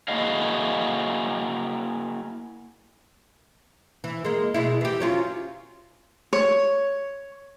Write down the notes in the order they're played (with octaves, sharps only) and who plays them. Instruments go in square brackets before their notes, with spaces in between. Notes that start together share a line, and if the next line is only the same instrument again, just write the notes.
[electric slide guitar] A#3 E4 F#4 G#4 D#5 F5
[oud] E3
G#3 A#3
B2 G#3 E4
E3 G4
F#3 C#4 F4
[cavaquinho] C#5